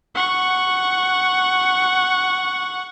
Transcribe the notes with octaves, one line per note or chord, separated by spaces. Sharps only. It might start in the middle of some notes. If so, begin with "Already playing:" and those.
F#5 C#6